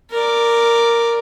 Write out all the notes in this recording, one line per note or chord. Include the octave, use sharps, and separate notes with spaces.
A#4 D5